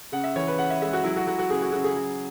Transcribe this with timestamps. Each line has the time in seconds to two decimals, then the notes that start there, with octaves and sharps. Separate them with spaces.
0.12 C#3 F#5
0.24 E5
0.36 E3 C#5
0.47 B4
0.58 C#3 F#5
0.70 E5
0.82 G#3 E5
0.93 F#4
1.04 F#3 E4
1.16 F#4
1.27 F#3 F#4
1.39 F#4
1.49 C#3 G#4
1.61 F#4
1.72 C#3 F#4
1.84 G#4
1.96 F#3